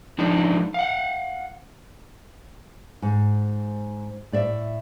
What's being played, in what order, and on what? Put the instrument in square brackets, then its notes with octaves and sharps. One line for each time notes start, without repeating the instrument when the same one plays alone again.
[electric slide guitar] F3 G#3 D4 D#4
F5 F#5
[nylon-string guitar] G#2
A2 D5 E5